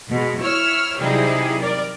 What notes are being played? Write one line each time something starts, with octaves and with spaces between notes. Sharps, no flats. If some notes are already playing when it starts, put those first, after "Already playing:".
B2 G#3
E4 C#5 E6 F6
C3 F#3 G3 D#4 E4 G#4
A#4 D5